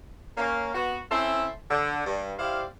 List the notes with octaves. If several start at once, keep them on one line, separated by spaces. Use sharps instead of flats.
A#3 C#4 F5
B3 F#4
C4 C#4 E4 A4 E5 C6
D3
G2
E4 G4 C5 D5 F5